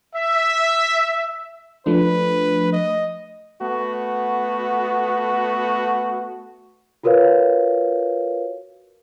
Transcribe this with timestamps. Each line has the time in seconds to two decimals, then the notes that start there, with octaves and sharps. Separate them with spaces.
0.15 E5
1.86 F3 A3 D4 B4
2.73 D#5
3.62 A3 B3 F#4
7.03 F4 F#4 A#4 B4 C#5 F5